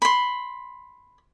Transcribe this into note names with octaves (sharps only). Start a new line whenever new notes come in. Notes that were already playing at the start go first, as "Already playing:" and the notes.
B5 C6